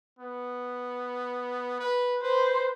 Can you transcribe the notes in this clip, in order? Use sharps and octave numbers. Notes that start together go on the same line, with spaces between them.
B3
B4
B4 C5